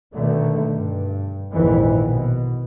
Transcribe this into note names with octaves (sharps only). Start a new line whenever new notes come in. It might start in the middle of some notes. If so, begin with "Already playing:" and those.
B2 D3 D#3 A3
G2
A#1 F2 G#2 D#3 E3
B2